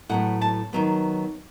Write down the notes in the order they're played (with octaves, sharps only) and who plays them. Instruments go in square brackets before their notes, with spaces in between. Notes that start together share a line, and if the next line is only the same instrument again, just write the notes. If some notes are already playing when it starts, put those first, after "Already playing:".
[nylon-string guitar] A2 F#3 B3 F#5
A5
D#3 F#3 B3